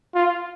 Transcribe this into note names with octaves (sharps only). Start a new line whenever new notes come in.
F4